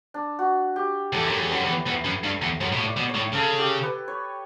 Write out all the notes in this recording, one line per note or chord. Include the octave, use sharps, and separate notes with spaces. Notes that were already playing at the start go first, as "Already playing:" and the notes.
D4
F#4
G4
E2 A4
F#2
C#5
E2
F#2 B4
E2
B4
E2 B4
F#2
G2
E2
F#2 C#5
B2
A2
D5
B2
C#5
A2
C#3 A4
G4
B4
C#5